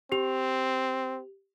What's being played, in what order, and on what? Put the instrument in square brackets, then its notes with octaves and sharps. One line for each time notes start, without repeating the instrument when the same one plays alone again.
[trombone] C4 [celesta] G4 F7